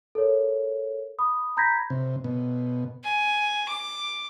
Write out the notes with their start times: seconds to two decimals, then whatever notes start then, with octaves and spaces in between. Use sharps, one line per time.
0.15 A4 A#4 C#5
1.19 B5 D#6
1.57 A#5 B5 G6 G#6 A#6 B6
1.90 C3
2.24 B2
3.04 G#5
3.69 D6